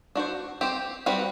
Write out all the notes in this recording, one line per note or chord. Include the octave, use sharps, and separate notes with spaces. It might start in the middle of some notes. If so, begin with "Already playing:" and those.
D4 F#4 C5
C4 G4 C5
G3 C4 F#4 B4